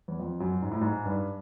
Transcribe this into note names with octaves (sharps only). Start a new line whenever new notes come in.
E2
F2
F#2
G#2
A2
G#2
G2